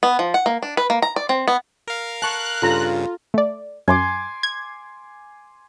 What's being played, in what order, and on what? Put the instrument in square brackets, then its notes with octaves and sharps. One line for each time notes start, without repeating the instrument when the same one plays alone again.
[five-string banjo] B3
F3
F#5
A#3
D4
B4
A#3
A#5
D5
C4
B3
[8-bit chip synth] A#4 F5
[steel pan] A5 C#6 [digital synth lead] F#6
[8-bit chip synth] G2 C#3 [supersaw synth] F4 [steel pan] A4 A#5
[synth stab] A3 D5
[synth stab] F#2 [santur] G#5 C6 D6
[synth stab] G#6